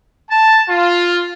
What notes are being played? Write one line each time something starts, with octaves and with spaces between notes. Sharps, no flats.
A5
F4